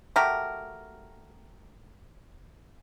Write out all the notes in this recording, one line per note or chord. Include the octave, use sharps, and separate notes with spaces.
A3 F#4 G4 A#4